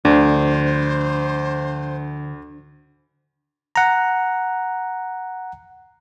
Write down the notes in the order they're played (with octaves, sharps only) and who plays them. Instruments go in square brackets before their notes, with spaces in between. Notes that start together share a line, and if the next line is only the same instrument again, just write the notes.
[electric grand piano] D2 [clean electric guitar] D3 F3 [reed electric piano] D4 [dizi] C5
[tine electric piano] F#5 A#5